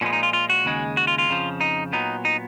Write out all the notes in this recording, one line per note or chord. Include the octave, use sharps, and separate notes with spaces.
A#2 F3 G#3 B3 C#4
D#4
F4
F4
F#4
D#2 C#3 G#3
F#4
F4
F4
F2 C#3 F3
D#4
A#2 F#3 B3 D#4
D#4